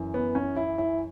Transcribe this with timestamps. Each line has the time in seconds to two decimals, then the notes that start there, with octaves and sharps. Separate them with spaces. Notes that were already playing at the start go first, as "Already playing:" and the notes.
Already playing: F#2 E3
0.14 B3
0.35 C#4
0.56 E4
0.78 E4